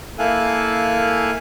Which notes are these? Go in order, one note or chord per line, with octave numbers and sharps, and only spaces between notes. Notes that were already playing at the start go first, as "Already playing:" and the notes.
A#3 E4 A4 F5 G#5 F#6